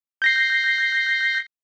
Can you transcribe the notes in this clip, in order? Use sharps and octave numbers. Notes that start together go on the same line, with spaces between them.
G6 A#6 C7